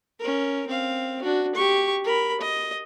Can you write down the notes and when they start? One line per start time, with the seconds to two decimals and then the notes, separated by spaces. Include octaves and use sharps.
0.19 C#4 A#4
0.67 C4 F5
1.22 D4 F#4
1.55 G4 C#6
2.04 A#4 B5
2.40 D#5